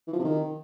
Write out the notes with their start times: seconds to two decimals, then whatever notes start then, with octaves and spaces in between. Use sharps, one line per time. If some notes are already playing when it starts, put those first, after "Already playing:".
0.07 E3
0.13 F3
0.19 C3
0.25 D#3